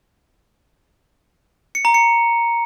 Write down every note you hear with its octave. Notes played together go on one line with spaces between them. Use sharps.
C#7
A#5
C#7